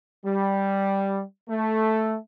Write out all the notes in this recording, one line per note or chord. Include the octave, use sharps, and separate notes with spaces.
G3
A3